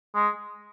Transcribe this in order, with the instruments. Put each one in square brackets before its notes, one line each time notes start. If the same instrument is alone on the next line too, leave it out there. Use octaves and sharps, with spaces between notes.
[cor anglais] G#3